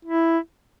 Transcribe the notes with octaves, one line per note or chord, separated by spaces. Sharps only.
E4